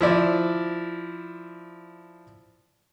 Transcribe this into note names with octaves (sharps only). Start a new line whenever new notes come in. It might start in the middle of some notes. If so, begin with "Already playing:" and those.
F3 E4 D5